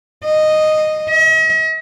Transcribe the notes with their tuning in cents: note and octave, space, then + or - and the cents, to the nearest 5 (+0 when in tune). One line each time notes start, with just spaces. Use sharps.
D#5 -10
D#5 +45